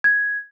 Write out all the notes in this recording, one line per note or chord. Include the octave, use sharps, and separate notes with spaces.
G#6